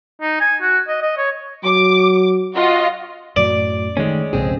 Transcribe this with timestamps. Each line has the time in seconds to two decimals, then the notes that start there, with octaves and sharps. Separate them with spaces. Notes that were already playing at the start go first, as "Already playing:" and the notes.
0.22 D#4
0.41 G#5
0.62 F#4
0.88 D#5
1.02 D#5
1.18 C#5
1.65 F#3 D6
2.55 F4 F#4 D#5
3.36 F#2 A2 F#3 D5
3.97 D#3 G#3 A3 C#4
4.33 B1 F2 G#2 C#3 C4 G#4